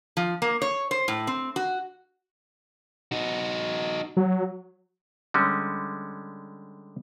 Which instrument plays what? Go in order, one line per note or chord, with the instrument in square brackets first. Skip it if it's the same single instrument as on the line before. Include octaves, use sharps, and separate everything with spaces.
[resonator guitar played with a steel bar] F3
A#3
C#5
C5
A2
C4
F#4
[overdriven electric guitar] D#4 F#4
[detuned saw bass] F#3
[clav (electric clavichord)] D3 G3 G#3 C#4